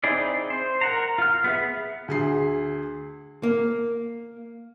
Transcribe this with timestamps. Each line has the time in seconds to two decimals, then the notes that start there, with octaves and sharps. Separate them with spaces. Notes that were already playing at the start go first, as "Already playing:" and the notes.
0.04 C4 D#4 E4 G#4 D5
0.50 C5
0.81 A#4 F#5 A#5
1.18 F4 F6
1.44 B3 G#4 E5
2.08 D2 G#4 C7
3.43 A#3